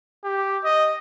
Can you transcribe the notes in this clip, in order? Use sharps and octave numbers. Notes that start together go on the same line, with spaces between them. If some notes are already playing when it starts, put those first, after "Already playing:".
G4
D#5